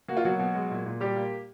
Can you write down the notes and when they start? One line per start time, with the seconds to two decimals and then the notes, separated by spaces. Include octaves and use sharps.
0.08 A#3 F#4
0.17 F4
0.24 B2 F#3 F#4
0.39 B2
0.55 G#3
0.71 A#2
0.86 A#2
1.01 G3 G4
1.16 A#3